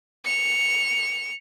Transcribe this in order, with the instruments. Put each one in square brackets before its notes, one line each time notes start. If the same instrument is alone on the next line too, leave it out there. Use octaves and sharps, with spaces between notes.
[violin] C#7 F7